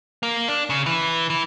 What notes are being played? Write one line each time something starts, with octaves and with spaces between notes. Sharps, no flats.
A#3
D4
C#3
E3
E3